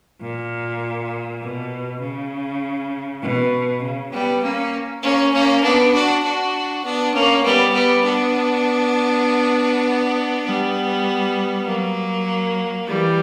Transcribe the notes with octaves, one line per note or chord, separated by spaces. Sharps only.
A#2
B2
C#3
B2
C#3
G3 B3
A#3 C#4
A#3 C#4
A#3 C#4
B3 D4
D4 F#4
D4 F#4
B3 D4
A#3 C#4
G3 B3
G3 B3
B3 D4
G3 B3
F#3 A#3
E3 G3